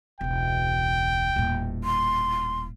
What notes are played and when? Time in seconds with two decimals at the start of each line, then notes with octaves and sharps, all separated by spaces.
0.21 E1 C#2 G5
1.36 D#1 A2
1.84 C6